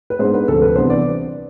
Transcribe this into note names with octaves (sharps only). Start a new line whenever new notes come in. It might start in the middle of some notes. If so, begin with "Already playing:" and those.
B4
G#2 G#3 B3 D4 C5
B4
D2 C3 F3 A4
B4
C2 C3 E3 B3 D4 C5
D5